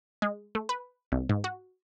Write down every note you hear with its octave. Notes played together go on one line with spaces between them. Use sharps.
G#3
A3
B4
C2
G#2
F#4